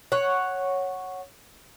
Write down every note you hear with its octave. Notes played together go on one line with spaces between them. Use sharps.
C#5 F#5